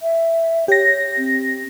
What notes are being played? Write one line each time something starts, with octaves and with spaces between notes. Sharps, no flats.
E5
G4 C#5 A#6
C4